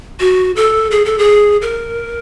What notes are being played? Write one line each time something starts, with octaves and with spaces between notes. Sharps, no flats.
F#4
A4
G#4
A4
G#4
A#4